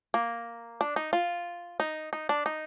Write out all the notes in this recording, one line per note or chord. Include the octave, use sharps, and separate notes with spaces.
A#3
D4
D#4
F4
D#4
D#4
D4
D#4